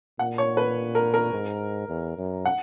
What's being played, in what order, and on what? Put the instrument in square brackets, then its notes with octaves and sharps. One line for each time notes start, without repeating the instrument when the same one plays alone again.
[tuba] A#2 [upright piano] F#5
[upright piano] C#5
B4
A#4
A#4
[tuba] G#2
E2
F#2
[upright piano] F#5